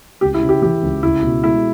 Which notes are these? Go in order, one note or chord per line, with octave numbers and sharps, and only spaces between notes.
C#2 G4
E4
C#3
G4
E3 G4
C#2
C#2 E4
B2
G#3 E4